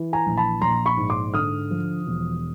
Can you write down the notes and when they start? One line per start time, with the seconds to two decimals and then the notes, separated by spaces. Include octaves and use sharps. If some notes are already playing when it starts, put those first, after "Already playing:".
Already playing: E3
0.13 G#5 A#5
0.26 A#1
0.37 A5 B5
0.61 A#1 A#5 C6
0.86 B5 C#6
0.97 G#2
1.10 C6 D6
1.34 D3 D#6 F6
1.71 F3
2.07 E1